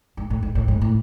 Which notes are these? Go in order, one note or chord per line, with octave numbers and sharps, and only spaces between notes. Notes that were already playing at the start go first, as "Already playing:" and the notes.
G#2
A2
G#2
A2
G#2
A2